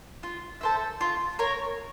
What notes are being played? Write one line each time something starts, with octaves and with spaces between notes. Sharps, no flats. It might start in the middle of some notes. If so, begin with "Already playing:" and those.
F4
A4 C5 E5
F4
A#4 C#5